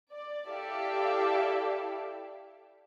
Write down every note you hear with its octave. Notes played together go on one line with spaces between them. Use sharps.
D5
E4 G4 A4 D5 E5 F5